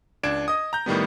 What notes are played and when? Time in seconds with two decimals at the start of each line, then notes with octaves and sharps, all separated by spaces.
0.23 C#2 D4 G#6 D7 E7
0.48 D#5 D#6
0.73 A#5 G6
0.86 A2 D#3 G3 B3